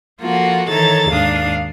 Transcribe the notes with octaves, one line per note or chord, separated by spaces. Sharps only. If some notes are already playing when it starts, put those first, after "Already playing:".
F3 A#3 F4 F#4 A4 F#5
D#3 E3 A4 C#5 A#5 A6
D#2 G#2 D4 F5 D#6